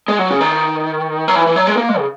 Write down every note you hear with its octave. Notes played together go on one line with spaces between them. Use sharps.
G#3
F#3
C#3
D#3
F#3
E3
E3
F#3
G#3
A#3
G#3
C#3